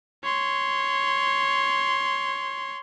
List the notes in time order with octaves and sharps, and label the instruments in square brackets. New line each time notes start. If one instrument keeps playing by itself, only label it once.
[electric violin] C#5 C6